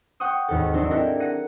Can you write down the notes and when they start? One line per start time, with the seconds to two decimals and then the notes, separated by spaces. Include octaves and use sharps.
0.20 F#5 G5 C#6 D#6
0.48 G#1 D#2 A4
0.74 F#3 C4 D4 D#4
0.91 E4 F#4 G4 A4 A#4 D5
1.20 F#5 A#6 C#7 D#7